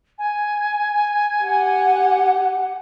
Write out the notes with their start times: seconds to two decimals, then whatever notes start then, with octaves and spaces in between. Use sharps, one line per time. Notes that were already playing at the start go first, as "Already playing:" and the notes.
0.18 G#5
1.44 G4 F#5